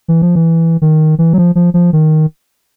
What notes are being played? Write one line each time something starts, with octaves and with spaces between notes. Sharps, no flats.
E3
F3
E3
D#3
E3
F#3
F3
F3
F3
D#3